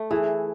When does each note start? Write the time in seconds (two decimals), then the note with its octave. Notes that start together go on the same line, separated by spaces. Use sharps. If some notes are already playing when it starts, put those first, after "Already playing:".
Already playing: A3
0.11 E3 E4 G#4